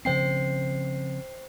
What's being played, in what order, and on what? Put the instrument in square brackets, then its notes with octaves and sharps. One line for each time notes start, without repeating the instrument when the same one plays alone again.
[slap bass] C#3 F3 C4 [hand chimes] C5 G5 C7